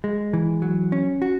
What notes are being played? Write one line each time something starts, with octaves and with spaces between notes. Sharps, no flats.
G#3
E3
F#3
C#4
F#4